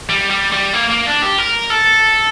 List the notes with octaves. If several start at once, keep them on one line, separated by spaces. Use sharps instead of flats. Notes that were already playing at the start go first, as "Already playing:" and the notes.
G3
G3
G3
A#3
A#3
D4
G4
A#4
A4